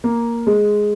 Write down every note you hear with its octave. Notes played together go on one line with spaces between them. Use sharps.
A#3
G#3